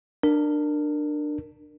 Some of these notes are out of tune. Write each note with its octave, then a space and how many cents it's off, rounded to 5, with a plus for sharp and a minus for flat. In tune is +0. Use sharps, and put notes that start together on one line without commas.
D4 +20 A#4 -5